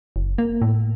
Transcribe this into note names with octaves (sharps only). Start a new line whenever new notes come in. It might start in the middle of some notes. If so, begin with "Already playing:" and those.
F#1
A#3
A2